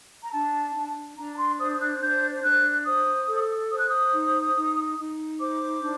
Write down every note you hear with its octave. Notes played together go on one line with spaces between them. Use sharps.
A#5
D4 A5
D4
D4 A#5
A#5
C6
C5 D#6
D#6
F#6
D4 G6
D4 F#6
C5 D#6
A4
C5 D#6
F#6
D#6
D#4
D#4
D#4
C5 D6
D4